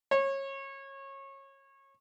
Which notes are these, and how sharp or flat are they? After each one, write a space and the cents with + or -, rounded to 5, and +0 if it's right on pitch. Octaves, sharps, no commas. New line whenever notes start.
C#5 -25